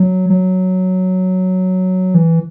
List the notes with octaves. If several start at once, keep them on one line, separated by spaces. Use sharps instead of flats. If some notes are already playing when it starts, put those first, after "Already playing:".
Already playing: F#3
F#3
E3